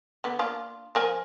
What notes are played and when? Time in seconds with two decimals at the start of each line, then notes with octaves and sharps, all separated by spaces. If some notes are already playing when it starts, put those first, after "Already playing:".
0.24 D3 B3
0.39 A#3 D4 F4
0.95 F3 A#4 G#5